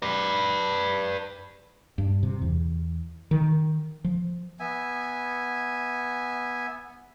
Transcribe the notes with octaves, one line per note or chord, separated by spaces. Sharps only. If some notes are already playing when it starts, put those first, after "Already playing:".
B4 D5
G2
C3
E2
D#3
F3
B3 E5 G#5